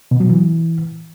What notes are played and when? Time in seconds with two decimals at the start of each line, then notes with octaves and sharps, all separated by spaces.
0.11 B2
0.20 F#3
0.29 E3